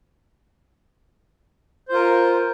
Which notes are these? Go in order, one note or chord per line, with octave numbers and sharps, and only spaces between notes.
F4 A#4 C5